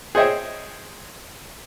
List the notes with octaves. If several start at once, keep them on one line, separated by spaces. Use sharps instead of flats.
G#4 C5 C#5 D#5 E5 G5